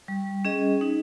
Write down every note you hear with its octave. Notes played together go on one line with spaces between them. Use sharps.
G3
C#4 G#4 D#5
D#4